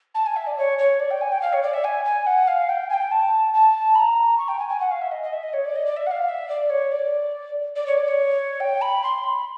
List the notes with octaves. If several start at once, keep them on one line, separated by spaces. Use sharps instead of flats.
A5
G#5
E5
D5
C#5
C#5
D5
G5
G#5
G5
F5
C#5
D5
E5
G#5
G#5
F#5
F5
G5
G#5
G5
A5
A5
B5
A#5
C#6
G5
G#5
G#5
F#5
F5
E5
D#5
D#5
E5
D#5
C#5
D5
D#5
D5
E5
F#5
F5
E5
D5
C#5
D5
D5
C#5
D5
C#5
G5
B5
C6
B5